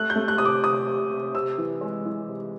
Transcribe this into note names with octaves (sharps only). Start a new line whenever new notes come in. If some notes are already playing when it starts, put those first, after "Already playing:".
Already playing: A3 F#6
G6
A3
F#6
C3 D#6
D6
C3 D#6
C3
C3
C3 E6
E3
G#3
E3
C3